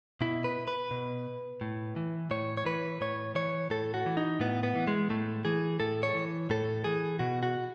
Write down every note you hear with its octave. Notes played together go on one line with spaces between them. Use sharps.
B2 E4
B4
B4
B2
A2
E3
A2 C#5
C#5
E3 B4
A2 C#5
E3 C#5
A2 A4
F#4
E3
D#4
A2 B3
B3
E3
G#3
A2 A3
E3 G#4
A2 A4
C#5
E3
A2 A4
E3 G#4
B2 F#4
F#4